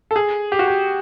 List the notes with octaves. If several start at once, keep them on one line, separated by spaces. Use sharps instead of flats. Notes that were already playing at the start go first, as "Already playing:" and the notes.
A4
G#4
G4
F#4
G4